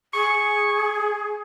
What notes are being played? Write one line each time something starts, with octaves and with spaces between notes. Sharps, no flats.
G#4 C#6